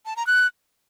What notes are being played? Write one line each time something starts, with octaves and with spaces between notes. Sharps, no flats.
A5
A#5
F#6